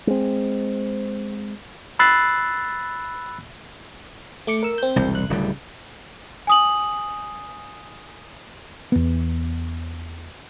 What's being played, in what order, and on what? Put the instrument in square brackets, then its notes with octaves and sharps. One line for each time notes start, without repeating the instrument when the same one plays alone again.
[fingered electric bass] G#3 C4
[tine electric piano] B5 E6 F#6 A6 C7
[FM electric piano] A3 D6 C#7
A#4 E6
C4 G6
[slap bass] E1 C2
[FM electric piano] F#6
[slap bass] D1 G3 [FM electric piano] C#3
[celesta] G#5 D#6 F#7
[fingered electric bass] E2 B3